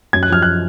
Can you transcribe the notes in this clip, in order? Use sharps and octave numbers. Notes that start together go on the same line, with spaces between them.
F#2 G#6
F#6
F3 F6
F#6